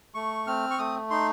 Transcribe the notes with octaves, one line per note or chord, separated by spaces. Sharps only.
A3 C#6
C4 F6
C#6
A3 D#6
D#4 C6